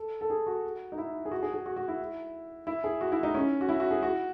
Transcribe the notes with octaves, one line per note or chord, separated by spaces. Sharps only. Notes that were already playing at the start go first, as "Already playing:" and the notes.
Already playing: A4
A4
G#4
F#4
D#4
E4
G#4
F#4
G#4
G#4
F#4
F#4
E4
E4
G#4
F#4
E4
D#4
C#4
F#4
E4
F#4
G#4
F#4